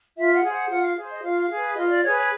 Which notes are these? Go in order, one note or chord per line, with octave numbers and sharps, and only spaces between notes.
F4 E5
F#5
G#4
C5 F#5
F4 F#5
F5
G#4 C5
D#5
F4 F5
G#4 B4
F4 D#5
D#5
D5
G#4 B4 C#5
C#5